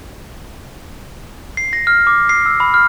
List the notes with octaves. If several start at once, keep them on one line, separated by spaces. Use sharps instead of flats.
C7
A#6
F6
D6
C7
E6
B5
F6